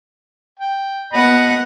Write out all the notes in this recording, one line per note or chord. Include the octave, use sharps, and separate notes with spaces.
G5
B3 D#5 F#5 B5